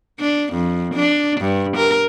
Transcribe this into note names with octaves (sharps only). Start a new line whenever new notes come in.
D4
F2
D4
G2
A#4